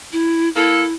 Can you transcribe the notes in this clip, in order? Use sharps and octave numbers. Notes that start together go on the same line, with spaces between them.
E4
A#3 E4 A4